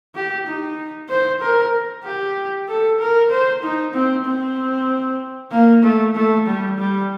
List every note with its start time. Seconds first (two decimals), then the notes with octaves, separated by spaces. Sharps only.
0.15 G4
0.46 D#4
1.09 C5
1.41 A#4
2.04 G4
2.68 A4
3.00 A#4
3.30 C5
3.63 D#4
3.94 C4
4.25 C4
5.51 A#3
5.83 A3
6.16 A3
6.47 G3
6.78 G3